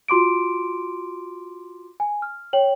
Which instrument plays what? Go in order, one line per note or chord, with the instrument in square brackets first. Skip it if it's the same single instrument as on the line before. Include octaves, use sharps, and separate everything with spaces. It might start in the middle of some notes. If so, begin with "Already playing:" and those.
[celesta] F4 F#4 C6 D6 D7
G#5
F6
C#5 G5 F#7